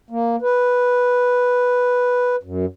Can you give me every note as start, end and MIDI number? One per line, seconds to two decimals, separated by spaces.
0.10 0.36 58
0.42 2.36 71
2.43 2.66 42